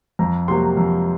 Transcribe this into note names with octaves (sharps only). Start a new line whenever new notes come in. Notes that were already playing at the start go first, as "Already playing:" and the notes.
F2 A#5
C3 F#3 A#3 C6
F2